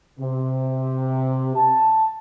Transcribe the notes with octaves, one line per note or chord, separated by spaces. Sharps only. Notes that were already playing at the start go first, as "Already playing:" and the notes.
C3
A5